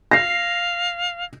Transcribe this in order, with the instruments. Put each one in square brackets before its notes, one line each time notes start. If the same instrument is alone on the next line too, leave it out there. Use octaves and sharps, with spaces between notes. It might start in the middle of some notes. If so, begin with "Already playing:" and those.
[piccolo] F5 [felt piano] A#6 C7